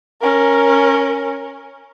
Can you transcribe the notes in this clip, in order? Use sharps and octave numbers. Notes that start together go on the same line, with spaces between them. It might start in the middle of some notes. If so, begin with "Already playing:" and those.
C#4 A#4